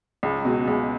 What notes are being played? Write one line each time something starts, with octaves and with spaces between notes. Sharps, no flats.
C#2
B2 G#3
C#2